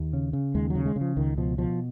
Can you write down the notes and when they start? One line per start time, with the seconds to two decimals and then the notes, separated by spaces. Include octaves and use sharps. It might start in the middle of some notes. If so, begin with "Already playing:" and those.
Already playing: D#2
0.13 C#3
0.33 C#3
0.55 D#2 G#3
0.70 F#3
0.75 C#3
0.86 G#3
0.96 C#3
1.01 F3
1.17 C#2 D#3
1.38 B2 F3
1.58 B2 F3